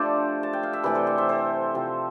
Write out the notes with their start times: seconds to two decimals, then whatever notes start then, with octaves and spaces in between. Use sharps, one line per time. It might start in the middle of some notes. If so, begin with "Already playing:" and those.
Already playing: F3 A3 D4 G4 A4 C5 D5
0.43 A5
0.53 G5
0.63 F5
0.73 E5
0.83 C3 E3 A3 B4 D5
0.95 A4 C5
1.07 C5 E5
1.18 C5 E5
1.29 A4 C5
1.75 C3 F3 C4